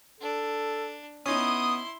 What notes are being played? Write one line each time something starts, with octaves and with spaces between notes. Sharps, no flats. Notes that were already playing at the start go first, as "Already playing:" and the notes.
D4 A4
B3 C#4 D#4 E4 C6 D#6